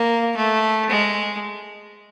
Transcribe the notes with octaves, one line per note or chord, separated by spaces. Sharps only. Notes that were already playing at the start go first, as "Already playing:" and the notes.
Already playing: A#3
A3
G#3